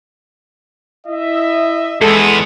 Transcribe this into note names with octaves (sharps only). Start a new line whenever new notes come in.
E4 D#5 E5
E2 G#3 B3 A4